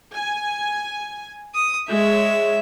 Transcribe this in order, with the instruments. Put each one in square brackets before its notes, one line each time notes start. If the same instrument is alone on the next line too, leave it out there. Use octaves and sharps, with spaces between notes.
[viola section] G#5
[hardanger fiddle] D#6
[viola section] G#3 C#5 [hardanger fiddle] E5